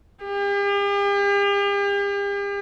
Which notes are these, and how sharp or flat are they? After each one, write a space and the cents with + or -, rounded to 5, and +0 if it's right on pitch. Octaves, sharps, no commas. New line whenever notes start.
G4 +45